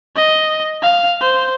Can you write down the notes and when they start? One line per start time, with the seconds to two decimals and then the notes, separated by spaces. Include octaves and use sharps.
0.16 D#5
0.82 F5
1.21 C5